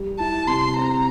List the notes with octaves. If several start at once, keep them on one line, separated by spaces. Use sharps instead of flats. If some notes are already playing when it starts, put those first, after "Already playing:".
Already playing: G3
E4 A5
C3 C6
C4 A#5